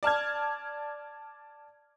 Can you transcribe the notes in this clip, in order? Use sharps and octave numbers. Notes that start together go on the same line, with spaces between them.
D5 A5 F6 G#6